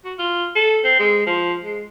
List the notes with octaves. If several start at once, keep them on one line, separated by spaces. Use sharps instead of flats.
F#4
F4
A4
C4
G#3
F3
G#3